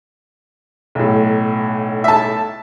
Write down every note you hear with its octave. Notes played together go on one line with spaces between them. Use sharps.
B1 A2
E5 A5